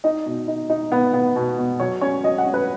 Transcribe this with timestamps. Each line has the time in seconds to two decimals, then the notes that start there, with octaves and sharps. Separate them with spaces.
0.04 D#4 D#5
0.25 B2
0.48 D#4
0.70 D#4
0.92 B3
1.14 B3
1.36 B2
1.58 B2
1.80 F#3 C#5
2.01 C#4 C#5
2.24 F#3 D#5
2.38 F#5
2.46 C#4
2.54 B4